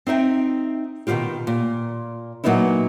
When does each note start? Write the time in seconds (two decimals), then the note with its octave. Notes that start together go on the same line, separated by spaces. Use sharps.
0.07 C4 D#4 E5 G5
1.07 B2 D#3 F3 F#3 F4 G4
1.47 A#2
2.44 A#2 F#3 A#3 B3 D#4 E4